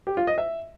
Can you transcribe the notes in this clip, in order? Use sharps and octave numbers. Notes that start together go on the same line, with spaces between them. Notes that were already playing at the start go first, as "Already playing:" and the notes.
G4
F4
D#5
E5